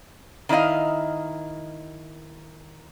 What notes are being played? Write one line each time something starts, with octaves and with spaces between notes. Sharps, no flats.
D#3 E4 A#4 D#5 F5